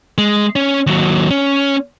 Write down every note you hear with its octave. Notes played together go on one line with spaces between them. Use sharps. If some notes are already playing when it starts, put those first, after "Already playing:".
G#3
C#4
D#2 F#3
C#4